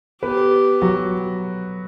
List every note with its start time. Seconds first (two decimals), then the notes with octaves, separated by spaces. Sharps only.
0.23 B3 G4 B4
0.82 F#3 F#4